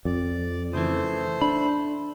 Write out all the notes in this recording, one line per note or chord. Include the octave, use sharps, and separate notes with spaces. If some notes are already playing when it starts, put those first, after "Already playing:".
F2 D5
C#3 E3 A3 C5
D4 B5